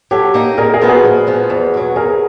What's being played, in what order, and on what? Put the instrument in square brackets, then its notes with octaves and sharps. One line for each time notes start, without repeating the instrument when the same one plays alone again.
[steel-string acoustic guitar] F#3 [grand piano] G4 A4
[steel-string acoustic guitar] A#3 D#4
[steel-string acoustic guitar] A#2 [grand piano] G#4 A#4
[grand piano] G#4 A#4
[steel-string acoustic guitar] F3 G#3 B3
[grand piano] F#4 G#4
[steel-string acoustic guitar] A#2
F3 G#3 B3
E2
B2 F#3
[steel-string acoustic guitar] E2 [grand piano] G#4 A#4